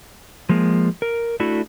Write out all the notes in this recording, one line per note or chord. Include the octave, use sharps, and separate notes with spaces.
F3 G#3 A#3
A#4
A3 D4 E4 F#4